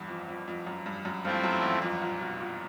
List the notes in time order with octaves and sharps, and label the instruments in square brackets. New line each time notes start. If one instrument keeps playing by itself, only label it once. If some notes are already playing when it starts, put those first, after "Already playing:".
Already playing: [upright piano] E2 G2
F2
F2
F2
F#2
G2
F#2
[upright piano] G2 [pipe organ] F3 A3 C4 E4
[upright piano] F#2
E2
F2
A#2
B2
A#2